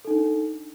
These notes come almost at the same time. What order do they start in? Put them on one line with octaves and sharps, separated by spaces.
A4 D#4 D4